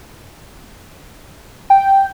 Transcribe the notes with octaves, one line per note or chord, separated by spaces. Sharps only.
G5